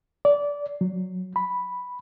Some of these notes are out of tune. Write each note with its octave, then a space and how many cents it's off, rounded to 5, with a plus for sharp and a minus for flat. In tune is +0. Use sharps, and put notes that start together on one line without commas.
D5 -20
F#3 -10
B5 +0